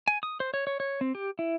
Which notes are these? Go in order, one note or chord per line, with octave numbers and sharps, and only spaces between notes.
G#5
D#6
C5
C#5
C#5
C#5
C4
G4
E4